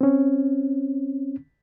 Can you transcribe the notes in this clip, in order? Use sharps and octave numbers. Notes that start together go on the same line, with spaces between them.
C4 C#4